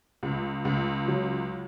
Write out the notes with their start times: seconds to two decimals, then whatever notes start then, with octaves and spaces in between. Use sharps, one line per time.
0.23 C#2
0.65 C#2
1.08 F#3